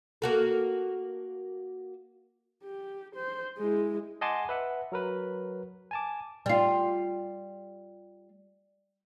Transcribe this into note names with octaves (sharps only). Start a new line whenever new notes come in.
A#3 F#4 A4
G4
C5
G#3 E4
D#5 F#5 G#5 A5 C6 D6
B4 E5 F#5
F#3 A#4 B4
G#5 A5 D6
G3 F4